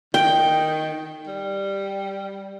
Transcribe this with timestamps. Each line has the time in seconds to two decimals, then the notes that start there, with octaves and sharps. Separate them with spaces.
0.14 D#3 G5
1.28 G3